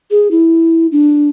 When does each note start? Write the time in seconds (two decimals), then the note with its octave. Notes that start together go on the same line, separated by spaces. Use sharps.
0.11 G#4
0.31 E4
0.92 D4